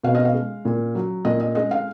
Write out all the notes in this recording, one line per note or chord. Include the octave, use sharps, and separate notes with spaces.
B2 F5
D#5
F5
G#3
A#2
F#3
A#2 D#5
D#5
G#3 D#5
F5